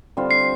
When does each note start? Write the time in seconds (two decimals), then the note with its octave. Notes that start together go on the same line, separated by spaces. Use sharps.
0.17 D3 G3 C4 F4
0.31 C7